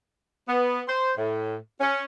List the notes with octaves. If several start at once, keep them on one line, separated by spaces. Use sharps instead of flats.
B3
C5
A2
C#4